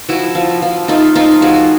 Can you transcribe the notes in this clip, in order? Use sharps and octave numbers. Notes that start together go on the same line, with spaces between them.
F3 E4 F#4
F3
F3
A3 D#4 F4
F3 D#4 F4
F3 F#4 G#4